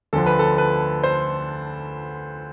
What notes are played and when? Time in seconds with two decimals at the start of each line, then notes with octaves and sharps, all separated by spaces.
0.13 D2 D3 F3 A4
0.26 B4
0.39 A4
0.58 B4
1.04 C5